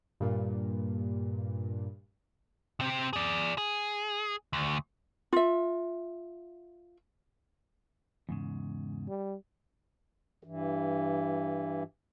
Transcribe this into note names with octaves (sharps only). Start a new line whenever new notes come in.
G2 A#2
C3 C4
G#4 D5
G#4
D2
F4 E5
E2 G#2 C#3
G3
G2 E3